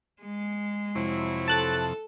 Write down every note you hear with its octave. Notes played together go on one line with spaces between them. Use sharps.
G#3
F2 C3 F#3 C4 E4
A4 A5 F#6 A6